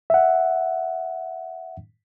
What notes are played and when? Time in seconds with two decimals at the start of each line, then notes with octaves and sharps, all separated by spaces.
0.10 E5 F#5